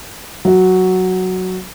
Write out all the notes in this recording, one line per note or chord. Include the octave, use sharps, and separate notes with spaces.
F#3 F#4